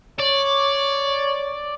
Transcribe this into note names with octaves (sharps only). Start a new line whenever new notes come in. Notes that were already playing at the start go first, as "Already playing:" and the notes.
C#5 D5